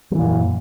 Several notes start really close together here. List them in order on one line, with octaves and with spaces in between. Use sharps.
F#3 E3 A#2 F#2